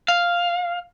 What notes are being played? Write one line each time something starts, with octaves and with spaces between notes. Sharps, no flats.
F5